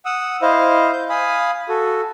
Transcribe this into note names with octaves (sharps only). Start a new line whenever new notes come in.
F#5 D#6 E6
E4 C5 D#5 F5
G6
F5 G#5 B5 D#6
F#4 A4